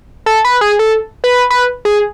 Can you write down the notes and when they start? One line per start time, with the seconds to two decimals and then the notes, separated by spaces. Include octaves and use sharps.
0.26 A4
0.45 B4
0.61 G#4
0.79 A4
1.24 B4
1.50 B4
1.85 G#4